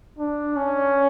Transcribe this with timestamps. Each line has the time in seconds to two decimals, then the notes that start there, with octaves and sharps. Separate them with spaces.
0.18 D4
0.56 C#4